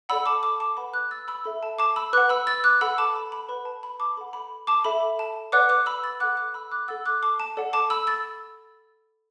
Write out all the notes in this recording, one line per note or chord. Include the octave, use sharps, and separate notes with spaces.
A4 D5 F#5 B5 E6
A5 D6
A5 D6
A5 D6
B4 F#5 B5
D6 F#6
E6 A6
B5 E6
A4 E5 B5
A5
A5 D6
B5 E6
B4 F#5 D6 F#6
B5 E6
E6 A6
D6 F#6
A4 F#5 B5 E6
A5 D6
B5
B5
B4 F#5 B5
A5
B5
A5 D6
A4 F#5 B5
B5
A5 D6
A4 E5 B5
A5
B4 D5 F#5 D6 F#6
D6 F#6
B5 E6
E6 A6
A4 F#5 D6 F#6
D6 F#6
B5 E6
D6 F#6
A4 F#5 E6 A6
D6 F#6
A5 D6
A5
A4 D5 F#5
A5 D6
B5 E6
E6 A6